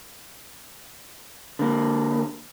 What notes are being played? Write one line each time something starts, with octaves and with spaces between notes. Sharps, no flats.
D3 A#3